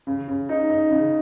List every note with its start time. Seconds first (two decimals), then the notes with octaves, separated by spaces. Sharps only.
0.07 C#3
0.28 C#3
0.49 D#4
0.70 D#4
0.91 C#3